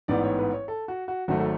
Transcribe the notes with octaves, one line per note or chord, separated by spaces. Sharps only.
A1 G#2 E3 B3 D5
C#5
B4
C#5
A4
F#4
F#4
G#1 G#2 F#3 A3 F#4
A4